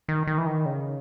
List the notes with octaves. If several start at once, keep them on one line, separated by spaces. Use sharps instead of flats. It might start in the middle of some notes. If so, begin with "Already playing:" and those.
D#3
D#3
E3
D#3
C#3